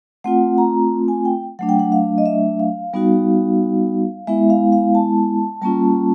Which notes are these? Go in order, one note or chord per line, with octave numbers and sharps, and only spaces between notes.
A3 C4 F4 F#5
A#5
G#5
G5
F#3 A3 D4 F#5
G5
F#5
F5
D#5
E5
F5
G3 B3 D#4 F#4
G#3 B3 E4 E5
F5
F5
A5
G3 A#3 C#4 F4 A5